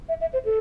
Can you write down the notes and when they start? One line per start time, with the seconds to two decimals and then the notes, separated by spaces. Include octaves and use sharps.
0.09 E5
0.21 E5
0.33 C5
0.45 A4